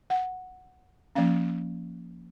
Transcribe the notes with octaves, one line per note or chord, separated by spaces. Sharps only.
F#5
F3 A#3 C#4 F5